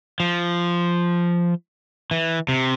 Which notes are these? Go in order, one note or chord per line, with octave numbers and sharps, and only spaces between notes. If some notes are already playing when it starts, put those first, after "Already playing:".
F3
E3
C3